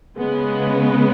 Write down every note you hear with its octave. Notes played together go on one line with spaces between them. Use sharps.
C#3 G#3 B3